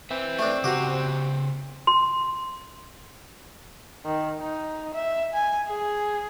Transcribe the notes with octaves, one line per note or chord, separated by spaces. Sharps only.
C4 B4 E5
A3 D4
C#3 F#4 G4 C5
C6
D#3
D#4
E5
G#5
G#4